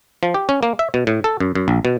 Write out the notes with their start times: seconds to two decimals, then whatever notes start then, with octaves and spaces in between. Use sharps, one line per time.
0.23 F3
0.34 G4
0.49 C#4
0.63 A#3
0.79 E5
0.94 B2
1.07 A2
1.24 A4
1.40 F#2
1.55 F#2
1.68 A#1
1.85 B2